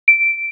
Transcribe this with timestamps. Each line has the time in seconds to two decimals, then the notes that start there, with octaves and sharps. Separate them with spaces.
0.08 D7